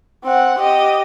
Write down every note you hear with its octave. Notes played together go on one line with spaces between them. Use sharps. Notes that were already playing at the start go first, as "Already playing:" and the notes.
C4 F#5
G4 D#5